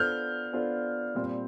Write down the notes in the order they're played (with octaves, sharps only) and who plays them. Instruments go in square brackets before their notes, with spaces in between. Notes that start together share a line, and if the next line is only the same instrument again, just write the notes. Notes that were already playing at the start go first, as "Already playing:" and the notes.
Already playing: [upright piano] B3 D4 F4 A4 C5 [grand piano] F6 G6
[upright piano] B3 D4 F4 A4 C5
A#2 G3 C4